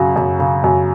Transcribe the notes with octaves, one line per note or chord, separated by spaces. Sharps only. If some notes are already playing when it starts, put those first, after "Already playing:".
Already playing: F#2 C#3 F#4
F#2
C#3
F#2